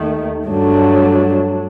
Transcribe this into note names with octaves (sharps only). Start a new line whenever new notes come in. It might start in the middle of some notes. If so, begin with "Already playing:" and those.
Already playing: D#2 D#3 A3
G2 F#3 A3 D4